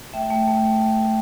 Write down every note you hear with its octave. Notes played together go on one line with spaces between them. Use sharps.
A3 E5 G5
A3
A3